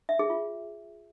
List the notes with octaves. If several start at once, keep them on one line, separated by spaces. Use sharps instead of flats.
E5
G#4
F4